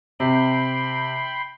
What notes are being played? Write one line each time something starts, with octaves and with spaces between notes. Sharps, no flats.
C3 G5 B5 C6